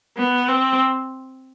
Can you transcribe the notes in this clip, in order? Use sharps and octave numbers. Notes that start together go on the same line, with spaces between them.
B3
C4